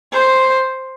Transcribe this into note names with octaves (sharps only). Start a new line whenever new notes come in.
C5